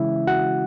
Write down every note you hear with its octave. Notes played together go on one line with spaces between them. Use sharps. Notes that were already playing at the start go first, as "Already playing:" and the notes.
Already playing: C#3 E3 G#3 C#4 E4 E5
F#4 F#5